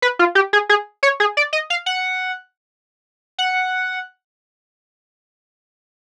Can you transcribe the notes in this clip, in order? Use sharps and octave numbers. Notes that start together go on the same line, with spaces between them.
B4
F4
G4
G#4
G#4
C#5
G#4
D5
D#5
F5
F#5
F#5